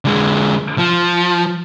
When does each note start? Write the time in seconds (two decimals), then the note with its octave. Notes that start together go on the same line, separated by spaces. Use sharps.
0.05 D3 G#3
0.78 F3